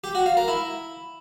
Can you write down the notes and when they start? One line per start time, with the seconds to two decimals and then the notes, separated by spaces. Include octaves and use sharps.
0.04 G4
0.15 F#4
0.26 F5
0.37 A#4
0.48 E4